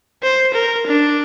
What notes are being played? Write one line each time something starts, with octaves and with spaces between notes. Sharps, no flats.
C5
A#4
D4